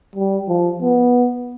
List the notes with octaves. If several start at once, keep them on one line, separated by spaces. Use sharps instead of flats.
G3
F3
B3